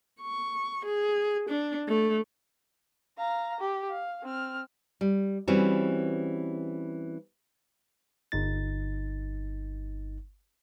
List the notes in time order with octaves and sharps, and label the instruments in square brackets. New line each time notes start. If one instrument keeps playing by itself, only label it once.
[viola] C#6
G#4
D4
A3
[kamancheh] F5 A#5
G4
F5
C4 F6
[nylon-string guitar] G3
E3 G3 C4 C#4 F#4
[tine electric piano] G1 D#4 A6